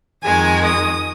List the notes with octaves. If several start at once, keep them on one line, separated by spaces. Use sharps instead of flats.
F2 D#3 G#3 G#5
D#6